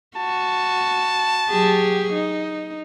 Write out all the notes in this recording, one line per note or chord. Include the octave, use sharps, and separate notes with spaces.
F#4 A5
F#3 G4 G#4
D#4